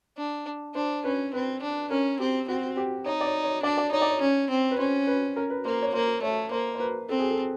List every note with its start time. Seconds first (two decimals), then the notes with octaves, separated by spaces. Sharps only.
0.17 D4
0.75 D4 C5
1.04 C#4 B4
1.33 C4 B4
1.62 D4
1.90 C#4 A#4
2.19 C4 G4
2.48 C4 F#4
2.77 G4
3.06 D#4 C#5
3.21 D5
3.25 C#5
3.44 C#5
3.63 D4 D5
3.77 D5
3.92 D#4 C#5
4.02 D5
4.11 C#5
4.21 C#4
4.50 C4
4.71 B4
4.79 C#4 C5
5.07 B4
5.36 A#4
5.50 B4
5.65 A#3 C5
5.82 C#5
5.93 A#3 C5
6.22 A3 C#5
6.51 A#3 C5
6.75 C5
6.80 B4
7.09 C4 A4
7.19 G#4
7.31 A4